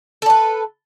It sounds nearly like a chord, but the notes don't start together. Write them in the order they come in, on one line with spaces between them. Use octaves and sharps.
A4 D5 B4